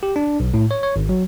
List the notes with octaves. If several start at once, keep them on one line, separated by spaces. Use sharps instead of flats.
G4
D4
B1
A2
C#5
C#5
G#1
F#3